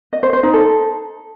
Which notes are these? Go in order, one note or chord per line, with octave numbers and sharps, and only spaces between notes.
D#5
C5
C5
D#4
A4